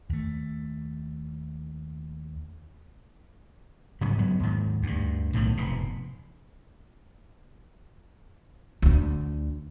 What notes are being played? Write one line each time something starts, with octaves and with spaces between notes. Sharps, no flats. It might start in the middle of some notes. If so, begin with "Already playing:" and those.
D#2 A3
G#2 C#3 F#3 G3
F#3 G#3 B3
D#2 G#2
D2 G2
B1 A2 C3 D#3
F1 G#2 B2
D2 D3